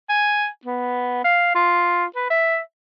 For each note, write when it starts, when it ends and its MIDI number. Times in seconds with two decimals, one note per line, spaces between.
0.09 0.48 80
0.65 1.23 59
1.24 1.54 77
1.55 2.05 65
2.16 2.30 71
2.30 2.59 76